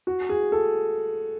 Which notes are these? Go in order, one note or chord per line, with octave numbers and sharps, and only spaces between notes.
F#4
G#4
A4